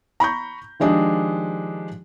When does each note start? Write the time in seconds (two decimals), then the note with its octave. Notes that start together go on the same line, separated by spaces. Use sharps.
0.20 A#5 B5 C#6 G6
0.80 D#3 F3 G#3 D4 G4 D#5